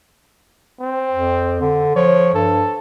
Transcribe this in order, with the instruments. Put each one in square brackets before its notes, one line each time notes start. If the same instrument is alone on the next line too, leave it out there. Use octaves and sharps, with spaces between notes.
[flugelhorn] C4
[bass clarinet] F2
D3
[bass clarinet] F3 [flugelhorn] C#5
[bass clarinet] G2 [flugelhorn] A4